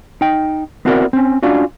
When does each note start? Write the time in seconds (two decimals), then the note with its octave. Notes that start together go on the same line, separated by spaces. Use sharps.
0.21 D#4 G5
0.85 B3 C4 E4 F#4 A#4 D5
1.13 C4 C#4
1.43 C#4 D4 F4 F#4